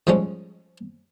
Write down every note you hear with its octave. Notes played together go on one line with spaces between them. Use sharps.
G#2 F3 G3 G#3 C#4